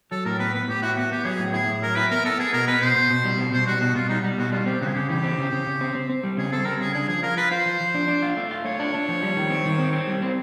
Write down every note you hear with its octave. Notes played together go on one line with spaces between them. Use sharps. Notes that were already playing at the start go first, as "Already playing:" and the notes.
F#3 A4
A2 A#4
B3 B4
B3 B4
A2 G4
E4 F#4
B3 F#4
B3 G4
F#3 G#4
A2
E4 G#4
A2
F#3 A#4
E4 B4
B3 A#4
B3 A4
B3 G#4
B2 A#4
B3 B4
B2 C5
B2
B2
G3
B2
B2 C5
G3 F#4
B2 F#4
B2 F4
G3 D#4
G3
B2 F#4
G3 F4
C4 G4
C#3 F#4
G#4
C#3 G4
E3 G4
C4
C#3
C#3
C#3
C4
C4
C4
G3
C#3 G#4
C4 A4
G3 A#4
C#3 G#4
D4 G#4
F3 G#4
F4 A#4
F4 B4
F4 C5
F3
F3
D4
D4
F4
A3
F4
A3 C#5
D4
D4
F3
G3
D#3
C4
D#3
C4
C4
G3
C4